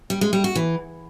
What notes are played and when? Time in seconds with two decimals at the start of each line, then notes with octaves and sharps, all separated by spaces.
0.10 G3
0.21 G#3
0.33 G3
0.44 F#4
0.55 E3